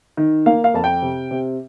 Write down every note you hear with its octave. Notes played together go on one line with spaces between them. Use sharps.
D#3
A#3 F5
F5
F2 A5
G5
C3
C3